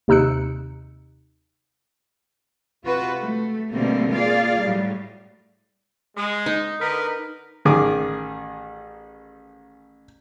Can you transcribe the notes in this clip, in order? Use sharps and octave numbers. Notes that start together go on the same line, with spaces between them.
D#2 C3 D#4 E6 F#6 C#7
C3 F4 F#4 B4
A3
B2 D3 G3 A3 A#3 C4
A#3 F4 G#4 D5 F5
A2 F#3 G3
G#3
D#4
D3 A#4 B4 D#5
A1 D#3 G#4 D6